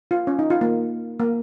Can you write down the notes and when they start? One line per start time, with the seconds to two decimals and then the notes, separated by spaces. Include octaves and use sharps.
0.11 F4
0.27 C#4
0.39 D#4
0.50 F4
0.61 A#3
1.19 A#3